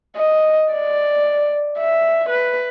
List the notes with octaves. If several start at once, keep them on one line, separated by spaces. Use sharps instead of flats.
D#5
D5
E5
B4